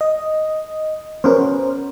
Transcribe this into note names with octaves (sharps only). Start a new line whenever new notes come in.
D#5
B3 C#4 A#4 C5